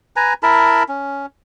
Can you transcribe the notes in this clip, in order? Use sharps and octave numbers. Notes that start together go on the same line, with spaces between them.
B4 G#5 A#5
E4 A#4 A5 B5
C#4